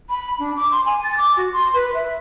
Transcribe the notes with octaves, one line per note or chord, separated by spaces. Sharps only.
B5
D4
D6
C6
G#5
A6
D6
F#4
C6
B4
E5